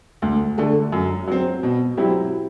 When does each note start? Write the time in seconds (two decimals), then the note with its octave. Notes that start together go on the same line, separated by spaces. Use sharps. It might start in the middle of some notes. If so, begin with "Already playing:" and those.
0.22 D2
0.58 D3 A3
0.92 F#2
1.27 F#3 C4
1.63 B2
1.97 F#3 C4 E4 G4